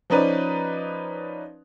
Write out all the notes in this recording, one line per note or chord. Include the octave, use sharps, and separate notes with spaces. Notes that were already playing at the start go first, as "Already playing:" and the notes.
F3 C#4 D#4 B4 D5